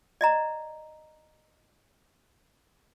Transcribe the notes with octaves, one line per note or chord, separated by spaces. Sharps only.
D5 D#5 A#5